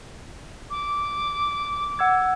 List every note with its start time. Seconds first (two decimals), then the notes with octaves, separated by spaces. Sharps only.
0.70 D6
1.99 F#5 E6 G#6